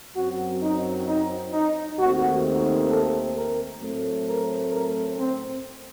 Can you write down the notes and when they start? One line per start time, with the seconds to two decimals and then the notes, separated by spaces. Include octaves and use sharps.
0.16 F#2 F#3 C4 F#4
0.61 D#4
1.07 D#4
1.53 D#4
1.98 D#2 D#3 A3 C4 F#4
2.90 A4
3.36 A#4
3.81 A2 F#3 A3 C4
4.27 A#4
4.73 A#4
5.19 C4